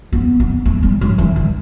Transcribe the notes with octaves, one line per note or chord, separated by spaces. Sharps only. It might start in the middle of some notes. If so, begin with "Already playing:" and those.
B3
B3
A3
G3
F#3
E3
G3